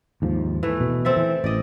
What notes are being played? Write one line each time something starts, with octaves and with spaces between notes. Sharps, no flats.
D#2 G#2 F3
E3 A3
B2
C4 A4 E5
E3
A1 D5 D#5